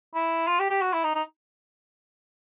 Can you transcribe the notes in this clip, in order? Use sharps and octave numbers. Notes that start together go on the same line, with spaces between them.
E4
F4
G4
G4
F#4
E4
D#4
D#4